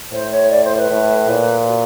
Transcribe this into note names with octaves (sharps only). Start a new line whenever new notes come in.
A2 C5
C#5
D5
C5
B4
A2
A#2
F#4